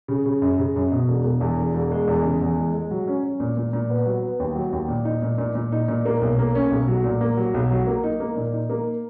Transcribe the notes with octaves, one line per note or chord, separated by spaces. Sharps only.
C#3
C#3
F#2
C#3
F#2
B2
E1
E1
E2
E1
E1
G#3
E2
C#3
E2
G#3
G#3
F#3
C#4
C#4
A#2
A#2
A#2
B3
F#3
B3
D#2
F#3
D#2
A#2
D#4
A#2
A#2
A#2
D#4
A#2
A#3
B1
A#3
C#4
B1
F#3
A#2
A#3
F#3
B1
F#3
A#3
D#4
A#3
A#2
D#4
A#3